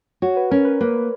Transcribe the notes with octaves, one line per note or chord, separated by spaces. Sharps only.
F#4 C#5
B4
C#4 A#4
B4
A#3 B4